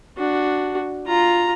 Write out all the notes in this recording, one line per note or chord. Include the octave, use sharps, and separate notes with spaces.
D4 F#4
F4 A#5